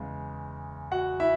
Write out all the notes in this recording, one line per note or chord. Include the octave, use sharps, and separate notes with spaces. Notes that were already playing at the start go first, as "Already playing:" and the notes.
Already playing: E2 C#3 G#3
F#4 F#5
E4 E5